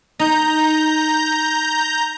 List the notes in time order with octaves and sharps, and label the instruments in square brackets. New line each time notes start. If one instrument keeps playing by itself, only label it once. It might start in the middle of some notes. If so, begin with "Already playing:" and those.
[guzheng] D#4 [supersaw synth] A#5 G6